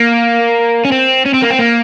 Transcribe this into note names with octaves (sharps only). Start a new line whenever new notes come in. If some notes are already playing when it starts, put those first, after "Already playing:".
Already playing: A#3
C#4
C4
C#4
C4
A#3
C4
A#3